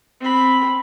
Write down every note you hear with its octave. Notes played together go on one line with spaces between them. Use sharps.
C4 B5